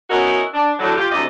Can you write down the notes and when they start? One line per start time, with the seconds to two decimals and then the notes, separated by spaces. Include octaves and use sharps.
0.10 B3 C#4 D#4 E4 F#4 A#4
0.54 D4
0.79 A2 D3 F#3
0.96 F4 G4
1.11 D2 C3 E3 D5 D#5